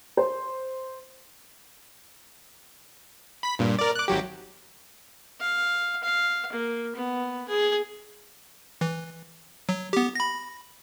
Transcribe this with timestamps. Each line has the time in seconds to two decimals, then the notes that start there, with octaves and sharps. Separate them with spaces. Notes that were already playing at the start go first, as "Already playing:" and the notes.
0.17 C5
3.43 B5 B6
3.59 G2 A#2
3.79 A#4 D5
3.95 D6 F#6
4.08 G#1 F#3 G4
5.40 F5
6.03 F5
6.52 A#3
6.95 B3
7.48 G#4
8.81 E3
9.69 F#3
9.93 B3 G4
10.15 B5 A#6